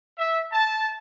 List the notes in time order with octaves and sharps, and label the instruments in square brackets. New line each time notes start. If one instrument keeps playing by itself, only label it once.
[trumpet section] E5
A5